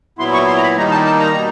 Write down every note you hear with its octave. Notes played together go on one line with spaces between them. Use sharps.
A#2 F#3 B3 E4 C6
C#6
C6
A#5
B5
D#3 G3 A#3 D#4 A#5
A5
A5
A#5
B2 G3 A#3 D#4